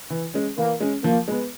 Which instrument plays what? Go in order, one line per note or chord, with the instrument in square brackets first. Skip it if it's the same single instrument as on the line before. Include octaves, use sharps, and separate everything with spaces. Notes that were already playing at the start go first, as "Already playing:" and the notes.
[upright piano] E3
G#3 C#4
[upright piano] E3 [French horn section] A#3
[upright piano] G#3 C#4
[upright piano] F3 [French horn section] A#3
[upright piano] G#3 B3